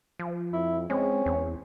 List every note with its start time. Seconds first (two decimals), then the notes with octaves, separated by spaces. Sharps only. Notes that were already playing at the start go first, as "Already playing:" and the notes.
0.20 F3
0.53 F2 E4
0.90 G#3 C4 C#4
1.26 E2